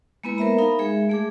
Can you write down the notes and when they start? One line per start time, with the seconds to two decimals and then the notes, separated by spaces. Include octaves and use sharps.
0.24 G#3 A#3 B3 E4 B4 B5
0.38 A#4 C5 E5 A#5
0.58 D#4 A#4 F5 B5
0.79 G#3 G#4 E5
1.09 A3 G#4 D6